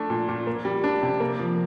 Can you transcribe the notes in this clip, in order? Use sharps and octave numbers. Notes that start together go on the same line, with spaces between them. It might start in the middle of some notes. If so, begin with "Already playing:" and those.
Already playing: A3 D4
A#2
A#2
A#3
G3
D4
C3
A#3
F3